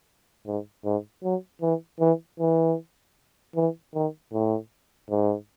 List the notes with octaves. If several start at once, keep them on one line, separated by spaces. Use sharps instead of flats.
G#2
G#2
F#3
E3
E3
E3
E3
D#3
A2
G#2